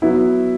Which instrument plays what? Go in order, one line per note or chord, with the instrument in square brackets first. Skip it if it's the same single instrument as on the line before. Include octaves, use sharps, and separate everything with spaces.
[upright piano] F#3 B3 E4